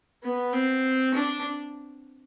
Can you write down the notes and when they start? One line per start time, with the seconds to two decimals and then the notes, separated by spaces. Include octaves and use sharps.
0.23 B3
0.53 C4
1.14 D4